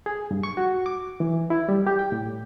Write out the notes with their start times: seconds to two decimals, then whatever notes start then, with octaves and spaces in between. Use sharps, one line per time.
0.06 G#4
0.31 G2
0.43 C#6
0.57 F#4
0.86 D6
1.20 E3
1.50 E4
1.69 G3
1.87 G4
1.99 G5
2.12 A2